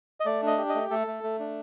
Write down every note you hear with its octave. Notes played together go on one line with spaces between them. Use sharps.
D#5
A3 D5
D4
D#5
G4
D#5
A3
A3 A4
A3
A3
D4